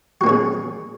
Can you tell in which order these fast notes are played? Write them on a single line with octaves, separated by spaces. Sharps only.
F#4 A#3 C#4 G#4